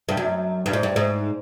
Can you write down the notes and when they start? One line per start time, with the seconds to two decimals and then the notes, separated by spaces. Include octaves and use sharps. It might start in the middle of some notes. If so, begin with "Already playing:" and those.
0.09 G2
0.17 F#2
0.66 G2
0.73 G#2
0.83 G2
0.96 G#2